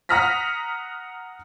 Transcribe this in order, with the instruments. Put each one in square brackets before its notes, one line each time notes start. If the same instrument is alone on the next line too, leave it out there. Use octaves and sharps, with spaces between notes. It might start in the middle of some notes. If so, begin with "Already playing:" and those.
[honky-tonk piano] F#5 A#5 D#6 F6 A#6 B6